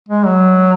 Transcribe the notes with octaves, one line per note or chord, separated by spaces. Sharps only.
G#3
F#3